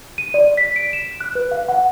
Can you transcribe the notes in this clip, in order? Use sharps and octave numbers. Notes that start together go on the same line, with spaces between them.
D#7
D5
B6
D7
E7
F#6
B4
F5
F#5